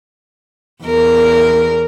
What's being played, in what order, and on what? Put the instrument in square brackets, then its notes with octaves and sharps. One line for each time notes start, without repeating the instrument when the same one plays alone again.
[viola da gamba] E2 A#4